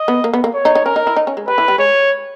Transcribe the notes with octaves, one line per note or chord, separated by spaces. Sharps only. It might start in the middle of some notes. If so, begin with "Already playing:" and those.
Already playing: D#5
B3
A#3
B3
A#3
C#5
D#4
D#4
C#4 A#4
D#4
E4
D#4
C#4
G#3
G3 B4
E3
G3
G#3 C#5